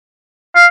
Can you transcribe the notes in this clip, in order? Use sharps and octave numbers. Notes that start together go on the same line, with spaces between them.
F5